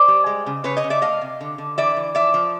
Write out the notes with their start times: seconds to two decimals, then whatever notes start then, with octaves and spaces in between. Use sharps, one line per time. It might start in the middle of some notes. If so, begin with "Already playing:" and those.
Already playing: C5 D5
0.08 G3
0.26 G#3
0.46 C#3
0.64 C#3 B4 C#5
0.77 C#5 D#5
0.84 C#3
0.90 D5 E5
1.02 A3 D#5 F5
1.21 C3
1.41 D3
1.58 D3
1.78 E3 D5 E5
1.97 E3
2.15 F3 D5 E5
2.34 F3